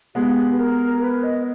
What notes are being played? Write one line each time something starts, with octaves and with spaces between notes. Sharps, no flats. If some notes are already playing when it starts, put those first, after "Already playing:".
G#3 B3 G4
B4
A#4
B4
D#5